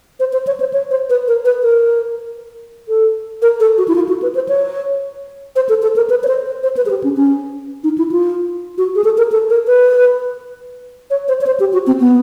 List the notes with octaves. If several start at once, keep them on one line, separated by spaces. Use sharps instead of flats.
C5
C5
C#5
C5
C#5
C5
B4
A#4
B4
A#4
A4
A#4
A4
F#4
E4
F4
F#4
B4
C5
C#5
C5
A4
A4
A#4
B4
C#5
C5
C5
C5
B4
G#4
G4
C#4
C#4
D#4
E4
F4
F#4
G#4
A4
A#4
A4
A#4
B4
C#5
C5
C#5
C5
G4
F#4
C4
B3